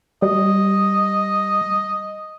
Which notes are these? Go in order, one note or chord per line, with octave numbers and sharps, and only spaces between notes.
G3 D#5